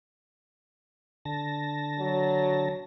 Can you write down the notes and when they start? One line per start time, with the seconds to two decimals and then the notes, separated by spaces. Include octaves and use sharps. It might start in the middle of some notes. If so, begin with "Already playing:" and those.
1.25 D3 A5 A#6
1.99 F#3